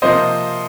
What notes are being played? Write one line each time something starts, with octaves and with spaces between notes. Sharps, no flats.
C3 F3 A#3 C5 D#5